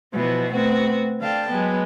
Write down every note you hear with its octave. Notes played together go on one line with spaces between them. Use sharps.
B2 E3 F3 B3 F#4
A3 B3 C4 F#4
D3 F5 G5 A5
F#3 G#3 B3